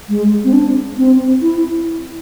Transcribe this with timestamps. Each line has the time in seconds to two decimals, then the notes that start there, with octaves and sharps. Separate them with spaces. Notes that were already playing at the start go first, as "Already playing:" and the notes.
0.09 G#3
0.44 C4
0.53 D4
0.98 C4
1.42 E4